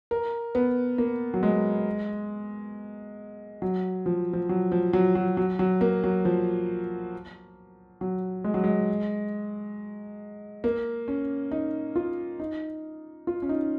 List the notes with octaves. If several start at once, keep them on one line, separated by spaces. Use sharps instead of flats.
A#4
B3
A#3
F#3
G#3
F#3
F3
F3
F#3
F3
F#3
F#3
F#3
F#3
A#3
F#3
F3
F#3
G#3
F#3
G#3
A#3
C#4
D#4
F4
D#4
F4
C#4
D#4